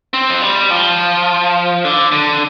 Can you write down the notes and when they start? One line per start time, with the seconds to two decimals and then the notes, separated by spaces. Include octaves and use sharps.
0.14 C4
0.30 F3
0.42 G3
0.70 F3
1.85 D3
2.12 D3